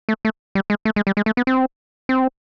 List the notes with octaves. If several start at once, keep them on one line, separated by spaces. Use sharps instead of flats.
A3
A3
G3
G#3
A3
G#3
G3
G#3
A3
B3
C4
C4